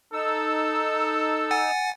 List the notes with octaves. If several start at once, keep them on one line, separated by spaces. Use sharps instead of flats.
D#4 A4 E6
F#5 G#5 A6